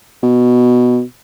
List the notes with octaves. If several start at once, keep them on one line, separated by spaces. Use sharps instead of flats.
B2